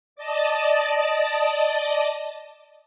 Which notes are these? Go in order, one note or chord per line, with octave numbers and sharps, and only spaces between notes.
D5 D#5 A5